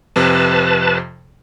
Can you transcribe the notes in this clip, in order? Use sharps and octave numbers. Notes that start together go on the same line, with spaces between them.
F2 C3 B4 A5